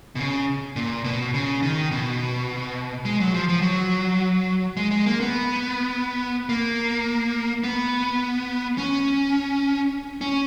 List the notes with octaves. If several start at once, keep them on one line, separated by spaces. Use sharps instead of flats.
B2
C#3
A#2
B2
C#3
D#3
B2
G#3
F#3
F3
F3
F#3
G#3
G#3
A#3
B3
A#3
B3
C#4
C#4